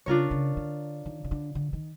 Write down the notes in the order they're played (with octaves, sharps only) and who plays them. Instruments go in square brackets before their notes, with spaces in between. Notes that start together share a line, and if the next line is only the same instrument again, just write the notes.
[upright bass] C#3 [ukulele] D4 F4 A#4 C#5
[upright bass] C#3
D3
D#3
C#3
D3
D3
D#3